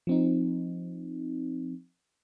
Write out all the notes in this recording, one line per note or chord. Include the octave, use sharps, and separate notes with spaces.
F3 C4 D#4